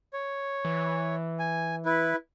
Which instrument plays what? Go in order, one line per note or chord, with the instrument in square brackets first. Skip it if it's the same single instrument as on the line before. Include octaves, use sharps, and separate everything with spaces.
[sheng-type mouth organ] C#5
[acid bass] E3
[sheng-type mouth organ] G#5
E4 B4